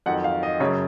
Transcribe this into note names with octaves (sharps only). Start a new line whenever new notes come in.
F2 D#3 F#3 F#5
F5
D#5
F#2 C#3 F#3 C#5